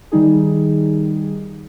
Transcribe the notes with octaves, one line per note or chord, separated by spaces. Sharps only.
D#3 G3 D#4 G#4